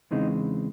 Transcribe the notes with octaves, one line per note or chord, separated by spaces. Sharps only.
E2 C#3 E3 G#3 C4 D#4